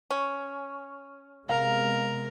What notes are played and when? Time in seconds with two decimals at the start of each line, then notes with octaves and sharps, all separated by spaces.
0.11 C#4
1.49 C3 G#3 B3 A#4 F5 A#5